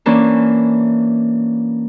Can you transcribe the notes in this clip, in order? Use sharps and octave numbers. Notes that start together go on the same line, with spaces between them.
E3 A#3 C#4 D4